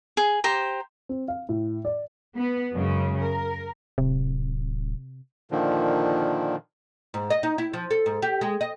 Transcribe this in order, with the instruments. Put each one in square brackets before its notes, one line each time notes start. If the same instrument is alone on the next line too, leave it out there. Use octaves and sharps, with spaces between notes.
[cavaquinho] G#4
G4 C5 A#5
[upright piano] C4
F5
A2
D5
[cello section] B3
F#2 C#3 G#3
A#4
[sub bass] D1 [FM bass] C3
[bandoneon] A#2 D3 D#3 F3
[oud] G#2
D#5
D#4
E4
F3
A4
G#2
G4
G#3
D#5